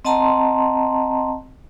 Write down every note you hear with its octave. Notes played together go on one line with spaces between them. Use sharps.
C4 D#5 F#5 A5 A#5 C6